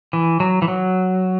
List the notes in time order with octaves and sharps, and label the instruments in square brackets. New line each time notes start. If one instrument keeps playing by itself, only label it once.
[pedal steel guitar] E3
F#3
E3
F#3